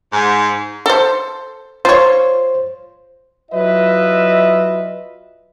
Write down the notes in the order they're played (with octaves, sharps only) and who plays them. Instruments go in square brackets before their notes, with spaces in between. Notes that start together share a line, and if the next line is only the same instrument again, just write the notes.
[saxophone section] G#2
[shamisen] A4 C5
[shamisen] F4 C#5 [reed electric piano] C5
[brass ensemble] F#3 E4 F4 B4 D#5 E5